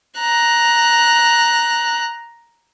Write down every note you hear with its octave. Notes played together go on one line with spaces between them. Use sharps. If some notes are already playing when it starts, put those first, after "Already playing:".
A#5 F#6